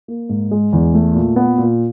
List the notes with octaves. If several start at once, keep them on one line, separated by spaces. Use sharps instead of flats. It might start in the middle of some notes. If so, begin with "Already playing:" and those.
A#3
G#2
G#3
E2
A3
A#2
B3
A#2